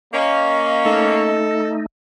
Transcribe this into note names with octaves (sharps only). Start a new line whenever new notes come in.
A#3 C#4 D#5
A3 D#4 A4